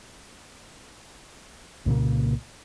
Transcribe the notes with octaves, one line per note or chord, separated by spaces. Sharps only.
C2 A#2 C#3 A#3